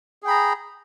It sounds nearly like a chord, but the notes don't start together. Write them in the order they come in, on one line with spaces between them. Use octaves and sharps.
G#4 G5 B5 A#5